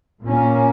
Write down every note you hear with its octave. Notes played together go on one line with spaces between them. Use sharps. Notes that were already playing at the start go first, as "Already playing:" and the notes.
A#2 A#3 C#4